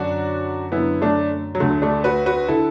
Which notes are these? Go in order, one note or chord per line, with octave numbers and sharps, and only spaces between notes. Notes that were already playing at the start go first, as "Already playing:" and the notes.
Already playing: F#2 D3 D4 F#4
F#2 D3 B3 E4
A3 D4
F#3
D2 D3 A3
A3 D4
F#4 B4
F#4 B4
D3 E4 A4